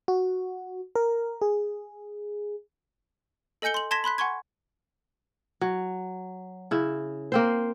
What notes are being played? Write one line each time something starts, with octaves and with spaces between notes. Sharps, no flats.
F#4
A#4
G#4
A4 D#5 G#5 G6 C#7 G7
C6 F#7
A5 C6 G#6 A#6 B6 E7
B5 C6 F#6 B6
F#5 G#5 C6 C#6 G#6
F#3
C#3 E4
A#3 C4 C5